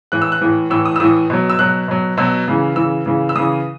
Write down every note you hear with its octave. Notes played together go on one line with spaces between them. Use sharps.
A2 E3 F#6
E6
F#6
A2 E3
A2 E3 E6
D#6
E6
A2 E3 D#6
B2 F#3
E6
B2 F#3 F#6
B2 F#3
B2 F#3 E6
C#3 E3
C#3 E3 E6
C#3 E3
E6
C#3 E3 D#6